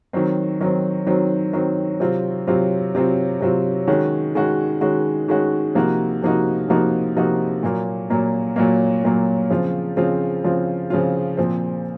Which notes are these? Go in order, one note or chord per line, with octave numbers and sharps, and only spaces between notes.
D#3 F#3 C4
D#3 F#3 C4
D#3 F#3 C4
D#3 F#3 C4
C3 F#3 C4 F4
C3 F#3 C4 F4
C3 F#3 C4 F4
C3 F#3 C4 F4
D#3 G#3 C#4 F#4
D#3 G#3 C#4 F#4
D#3 G#3 C#4 F#4
D#3 G#3 C#4 F#4
C3 F3 A#3 D#4 F#4
C3 F3 A#3 D#4 F#4
C3 F3 A#3 D#4 F#4
C3 F3 A#3 D#4 F#4
A#2 F#3 A#3
A#2 F#3 A#3
A#2 F#3 A#3
A#2 F#3 A#3
C#3 F3 C4 F4
C#3 F3 C4 F4
C#3 F3 C4 F4
C#3 F3 C4 F4
A#2 F3 C4